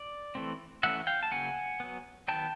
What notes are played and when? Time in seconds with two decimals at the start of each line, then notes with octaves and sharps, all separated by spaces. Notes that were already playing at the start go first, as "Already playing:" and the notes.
Already playing: D5
0.35 E3 A3 C4
0.83 E3 A3 C#4 E5 F#5
1.07 F5 G5
1.23 A5
1.31 C#3 F#3 A#3 C#4 F#5 G#5
1.80 F#3 B3
2.28 D#3 F#3 B3 G5 A5